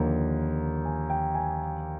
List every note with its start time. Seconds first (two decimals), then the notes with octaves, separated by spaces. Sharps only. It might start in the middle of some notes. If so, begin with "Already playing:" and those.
Already playing: D#2 D3 F3 A#3
0.85 G#5
1.10 G5
1.35 G#5